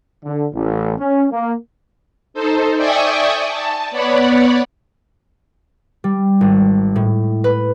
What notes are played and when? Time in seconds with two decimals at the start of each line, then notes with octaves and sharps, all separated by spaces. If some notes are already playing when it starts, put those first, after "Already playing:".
0.24 D3
0.54 A1
0.98 C#4
1.32 A#3
2.34 D#4 A4 C5
2.76 D5 E5 G5 G#5 C#6 D#6
3.48 A5
3.91 B3 C#5 D5 F#5 B5
6.04 G3
6.41 G#1
6.96 A2
7.44 B4